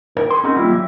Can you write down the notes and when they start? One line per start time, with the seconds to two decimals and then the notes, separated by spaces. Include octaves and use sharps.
0.17 A#4
0.30 A4 C6
0.44 C4 C#4 D#4 F#4 G#4 A#4
0.57 G3 A#3 E4 F4 G4
0.70 F#3 E5